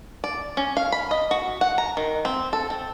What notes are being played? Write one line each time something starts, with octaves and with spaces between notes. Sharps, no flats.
D5
C#4
F5
B5
D#5
F#4
F#5
A#5
D#3
C4
A4
C4